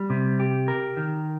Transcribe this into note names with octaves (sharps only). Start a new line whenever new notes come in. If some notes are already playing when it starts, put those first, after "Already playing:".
Already playing: G3
C3
G4
A#4
D#3